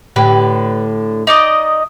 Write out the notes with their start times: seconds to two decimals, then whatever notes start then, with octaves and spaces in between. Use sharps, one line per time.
0.16 A2 D3 G4 B4
1.27 D#4 D5 D#5